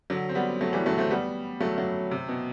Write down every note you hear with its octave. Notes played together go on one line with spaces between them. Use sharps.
D3 F#3
C4
G3 B3
F#3 A3
E3 G3
F#3 A3
A3 C4
G3 B3
F#3 A3
F#3 A3
C3
B2